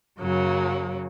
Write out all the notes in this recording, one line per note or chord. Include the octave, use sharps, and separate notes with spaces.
F#2 C#3 F#3 A#3